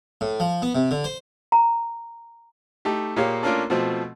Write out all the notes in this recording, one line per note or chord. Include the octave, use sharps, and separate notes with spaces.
A2
F3
B3
C3
D3
C5
A#5
A3 D#4 G4
A#2 A#3 G4 G#4 C#5 F5
A3 A#3 C#4 D4 F4 A#4
B2 F3 A3 C4